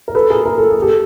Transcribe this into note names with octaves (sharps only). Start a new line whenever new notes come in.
A#4
A4 B4
G#4 A#4
A#4
A4
G#4
G4 A4